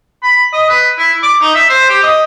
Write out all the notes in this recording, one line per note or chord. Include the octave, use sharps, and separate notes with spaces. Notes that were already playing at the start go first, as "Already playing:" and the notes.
B5
D#5
B4
E4
D6
D#4
E5
C5
G4
D#5